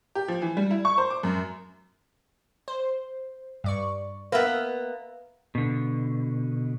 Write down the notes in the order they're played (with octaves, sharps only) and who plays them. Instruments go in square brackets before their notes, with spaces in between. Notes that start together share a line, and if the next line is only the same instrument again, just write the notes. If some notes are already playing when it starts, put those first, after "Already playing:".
[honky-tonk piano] G4
F3
E3
G3
E4
C#6
C5
D6
F#2
[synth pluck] C5
G2 D5 C#6
[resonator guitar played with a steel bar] A#3 B3 [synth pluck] B4 E5
[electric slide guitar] B2 D3